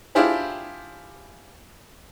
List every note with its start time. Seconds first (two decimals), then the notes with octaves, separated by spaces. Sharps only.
0.15 D4 E4 F4 G4 G#4 C5